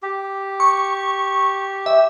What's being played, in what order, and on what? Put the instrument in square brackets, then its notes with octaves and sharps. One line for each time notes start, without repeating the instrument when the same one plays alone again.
[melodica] G4
[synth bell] C#6
E5